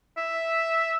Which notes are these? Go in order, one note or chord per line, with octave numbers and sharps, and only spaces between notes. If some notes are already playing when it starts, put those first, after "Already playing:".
E5